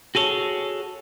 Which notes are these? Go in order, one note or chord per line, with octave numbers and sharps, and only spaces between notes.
F#4 G#4 A4 C#5